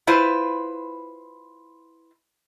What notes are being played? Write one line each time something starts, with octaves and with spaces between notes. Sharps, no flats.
E4 F4 B4 C5